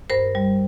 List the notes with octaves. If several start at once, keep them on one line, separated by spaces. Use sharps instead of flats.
G2 A#4 C5
G3